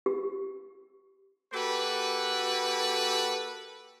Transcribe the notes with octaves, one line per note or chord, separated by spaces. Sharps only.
G4
A#3 F#4 G4 A4 B4